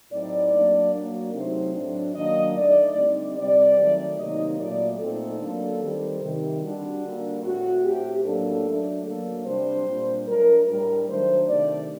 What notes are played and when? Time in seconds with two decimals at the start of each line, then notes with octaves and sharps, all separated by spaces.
0.12 A2 F#3 C4 D#4 D5
0.52 F#3 A#3 D4
0.94 F#3 A#3 D4
1.33 C3 F#3 A3 C4 D#4 C5
1.74 A2 F#3 A3 D4
2.14 D#3 F#3 A#3 D4 D#5
2.56 D3 A3 D#4 D5
2.96 D3 G3 C4 D#4
3.36 C3 G3 C4 D5
3.77 D#3 F#3 A3 D#4
4.18 C3 D#3 F#3 A#3 D#4 D#5
4.59 A#2 F#3 A3 D5
4.98 A#2 A3 C4 D#4 A4
5.39 D3 F#3 A#3 D4
5.80 D#3 G3 C4
6.21 C3 D#3 G3
6.61 D3 G3 D4 F#4
7.02 D3 G3 A#3
7.43 A2 A3 C4 F#4
7.83 A2 A3 C4 G4
8.23 A2 F#3 A#3 D4 A4
8.64 F#3 A3 D4
9.05 D3 F#3 A#3 D4 A4
9.45 C3 G3 D4 C5
9.85 A#2 G3 D4
10.27 F#3 A3 D4 A#4
10.67 A2 G3 D4 A#4
11.07 D#3 F#3 A3 D4 C5
11.48 C3 D#3 A3 D4 D5